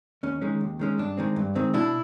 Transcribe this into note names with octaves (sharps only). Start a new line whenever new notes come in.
D#2 C#4
D#3 G#3 C#4
D#2
D#3 G#3 C#4
G2 D4
D#3 G#3 C4
G2
D#3 G#3 C4
B2 D4 E4